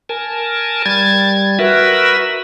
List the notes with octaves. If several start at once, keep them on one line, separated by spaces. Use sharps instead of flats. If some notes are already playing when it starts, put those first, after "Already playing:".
A#4 G#5 A5
G3 G#6 A6
F#4 A#4 B4 E5